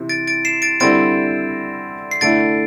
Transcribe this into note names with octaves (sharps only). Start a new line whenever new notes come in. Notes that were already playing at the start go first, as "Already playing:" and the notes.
Already playing: C3 E3 C4
A6 D7
A6 D7
C7 E7
A6 D7
D3 G3 C4 E4 A6 D7
C7
D3 A3 E4 A6 D7